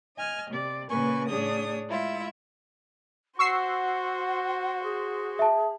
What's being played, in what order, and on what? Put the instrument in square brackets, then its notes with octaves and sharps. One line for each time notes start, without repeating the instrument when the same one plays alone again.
[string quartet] D#5 G#5 F6
C3 D5
A#2 C#3 A#3 B4 G#5 C#6
A2 D4 G#4 C#5 D#6
G#3 E4 F4 E5
[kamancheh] F#4 C5 [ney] F#5 [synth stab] C#6 E6 C7
[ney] G#4
[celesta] E5 A5